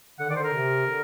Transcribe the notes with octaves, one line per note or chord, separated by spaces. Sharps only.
D3 F#5
D#3 D5
D3 C5
A#4
C3
D3